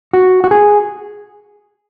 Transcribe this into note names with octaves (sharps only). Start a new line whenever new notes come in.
F#4
F#4
G#4